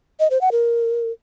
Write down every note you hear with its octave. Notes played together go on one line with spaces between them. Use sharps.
D#5
C5
F#5
A#4